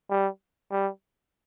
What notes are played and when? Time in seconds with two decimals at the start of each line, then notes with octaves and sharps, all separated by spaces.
0.10 G3
0.71 G3